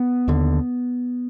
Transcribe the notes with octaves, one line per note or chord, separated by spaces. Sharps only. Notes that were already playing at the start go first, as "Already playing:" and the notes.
Already playing: B3
D#2 D3